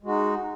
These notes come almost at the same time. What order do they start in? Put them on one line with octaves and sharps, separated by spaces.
G#3 F#4 D#4